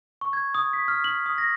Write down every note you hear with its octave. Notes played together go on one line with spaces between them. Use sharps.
C#6
G#6
D#6
B6
F6
F#7
D#6
A#6